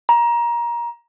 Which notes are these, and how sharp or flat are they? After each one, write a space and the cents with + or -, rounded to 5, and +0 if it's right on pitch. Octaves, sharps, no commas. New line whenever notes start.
A#5 +20